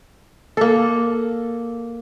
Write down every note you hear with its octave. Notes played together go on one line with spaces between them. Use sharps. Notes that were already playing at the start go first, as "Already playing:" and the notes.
A#3 A4